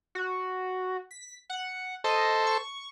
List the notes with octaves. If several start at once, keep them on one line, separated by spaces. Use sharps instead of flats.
F#4
B6
F#5
A4 C5 D#5
C#6